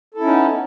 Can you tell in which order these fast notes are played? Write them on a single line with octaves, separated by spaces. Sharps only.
A4 E4 C#4 D#4 B3